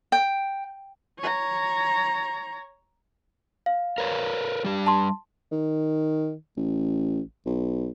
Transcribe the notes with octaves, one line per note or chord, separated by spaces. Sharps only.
G5
C#5 A#5
F5
A#4 B4 C#5
G3 D4 G4
A5 C6
D#3
A1
B1